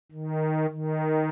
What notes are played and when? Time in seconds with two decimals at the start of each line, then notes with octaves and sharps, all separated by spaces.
0.12 D#3
0.70 D#3